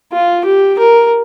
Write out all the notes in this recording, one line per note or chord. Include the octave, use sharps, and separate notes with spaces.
F4
G4
A#4